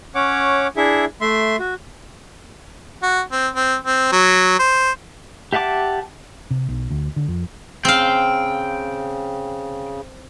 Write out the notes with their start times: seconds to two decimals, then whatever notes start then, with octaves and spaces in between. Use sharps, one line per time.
0.15 C#4 C#5 F#5 D6
0.77 D4 E4 G#4 E5
1.21 A3 E5 C6
1.59 F#4
3.03 F#4
3.32 C4
3.55 C4
3.85 C4
4.12 F#3
4.59 C5
5.53 G4 E5 F#5 A5 D6
6.51 C3
6.69 B1
6.90 D2
7.16 D3
7.28 F2
7.85 C#3 C4 F5 G5